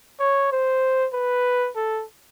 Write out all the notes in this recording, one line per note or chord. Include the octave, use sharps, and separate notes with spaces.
C#5
C5
B4
A4